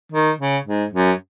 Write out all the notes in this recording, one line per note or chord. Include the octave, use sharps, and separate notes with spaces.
D#3
C#3
G#2
F#2